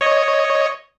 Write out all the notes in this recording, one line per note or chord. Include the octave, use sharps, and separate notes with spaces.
C#5 D#5